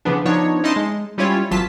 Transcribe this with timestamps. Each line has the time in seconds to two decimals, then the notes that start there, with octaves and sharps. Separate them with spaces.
0.05 C#3 E3 F3 B3 D4
0.25 F3 B3 D4 D#4 C#5
0.63 C#4 D#4 E4 D#5 A5 C6
0.76 G#3
1.18 G3 C#4 E4 F4 C#5
1.51 G#1 E3 F#3 F4 A5 B6